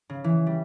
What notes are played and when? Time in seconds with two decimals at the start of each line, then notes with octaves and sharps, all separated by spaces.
0.10 C#3
0.24 E3
0.47 G3